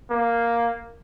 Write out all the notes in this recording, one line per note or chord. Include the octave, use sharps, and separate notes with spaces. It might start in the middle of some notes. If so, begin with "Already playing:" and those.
A#3